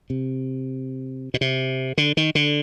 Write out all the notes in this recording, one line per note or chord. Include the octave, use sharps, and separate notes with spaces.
C3
B2
C3
D3
D#3
D3